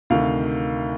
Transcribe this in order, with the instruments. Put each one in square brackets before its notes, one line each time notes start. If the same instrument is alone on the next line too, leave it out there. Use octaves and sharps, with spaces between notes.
[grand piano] D2 C3 D#3 F5